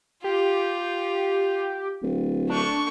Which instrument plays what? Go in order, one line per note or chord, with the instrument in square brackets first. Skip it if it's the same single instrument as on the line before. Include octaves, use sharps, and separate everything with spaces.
[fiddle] F4 [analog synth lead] G4
[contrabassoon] D1
[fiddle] A3 C#6 [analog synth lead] D4